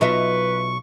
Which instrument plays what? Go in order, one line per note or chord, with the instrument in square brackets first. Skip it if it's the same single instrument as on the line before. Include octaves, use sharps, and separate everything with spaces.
[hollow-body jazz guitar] B1 F#3 [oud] F4 D#5 E5 [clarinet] B4 [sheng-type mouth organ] C#6